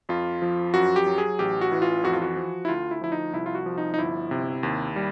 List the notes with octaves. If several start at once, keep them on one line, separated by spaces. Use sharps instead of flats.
F2 F4
F3
F#2 F#4
G4
F#3
G#4
A1 G4
F#4
E3
F4
F2 F#4
F4
F#4
F3
E4
D2 F4
E4
F3 E4
D#4
C2 E4
F4
F#4
F3
D#4
D#4
G1 E4
C3
D#2
G3